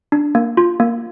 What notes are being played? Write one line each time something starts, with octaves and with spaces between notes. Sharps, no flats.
D4
A#3
F4
A#3